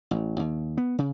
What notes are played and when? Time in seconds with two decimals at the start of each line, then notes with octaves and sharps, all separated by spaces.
0.11 A1
0.39 D#2
0.78 B3
0.98 C#3